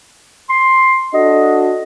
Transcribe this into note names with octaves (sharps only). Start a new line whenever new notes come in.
C6
D4 F#4 A4 D#5